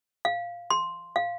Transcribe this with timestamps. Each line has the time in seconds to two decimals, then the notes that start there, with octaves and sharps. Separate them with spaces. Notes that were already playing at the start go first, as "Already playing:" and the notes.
0.25 F5
0.70 C6
1.16 F5